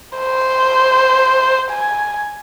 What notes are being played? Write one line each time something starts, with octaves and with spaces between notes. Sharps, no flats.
C5
G#5